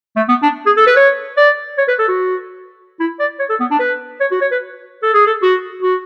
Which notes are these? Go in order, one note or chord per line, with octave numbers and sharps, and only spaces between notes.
A3
B3
D4
G#4
A4
B4
C#5
D5
C#5
B4
A4
F#4
E4
D5
C#5
A4
B3
D4
B4
C#5
F#4
C#5
B4
A4
G#4
A4
F#4
F#4